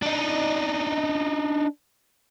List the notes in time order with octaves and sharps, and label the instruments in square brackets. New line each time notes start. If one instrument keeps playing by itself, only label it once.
[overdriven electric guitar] D4 D#4